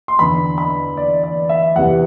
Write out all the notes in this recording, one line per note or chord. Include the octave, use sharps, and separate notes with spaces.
C6
E2 D3 B5
B5
D5
D5
E5
E2 C3 E3 F#5